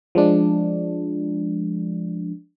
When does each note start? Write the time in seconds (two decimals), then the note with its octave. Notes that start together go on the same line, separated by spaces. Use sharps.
0.15 F3 G#3 D4